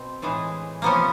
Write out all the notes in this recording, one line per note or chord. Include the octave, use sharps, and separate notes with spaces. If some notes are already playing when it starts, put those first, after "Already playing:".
Already playing: B2 C4
A2 E3 G#3
C3 F3 A#3 B3 C#4